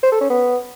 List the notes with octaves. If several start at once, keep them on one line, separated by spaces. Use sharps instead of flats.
C5
A4
C#4
B3